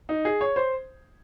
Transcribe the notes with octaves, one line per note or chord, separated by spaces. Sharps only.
D#4
G#4
C#5
C5